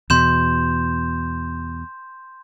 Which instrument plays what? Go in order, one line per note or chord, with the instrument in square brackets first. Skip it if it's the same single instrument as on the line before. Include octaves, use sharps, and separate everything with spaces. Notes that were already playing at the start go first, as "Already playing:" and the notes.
[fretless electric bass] E2 B2 [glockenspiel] C6 G6 E7